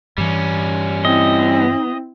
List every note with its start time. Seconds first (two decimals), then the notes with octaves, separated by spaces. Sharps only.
0.18 G2 E3 G3 C#4
1.05 C4 E4 D#5